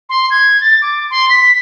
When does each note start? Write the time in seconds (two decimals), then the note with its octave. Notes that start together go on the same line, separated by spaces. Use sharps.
0.10 C6
0.31 G#6
0.61 A6
0.82 D6
1.11 C6
1.30 B6